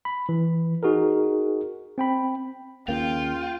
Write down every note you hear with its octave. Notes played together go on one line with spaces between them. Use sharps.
B5
E3
D#4 F#4 G#4 A#4
C4 G5 B5
D#2 C#3 A#3 F4 G5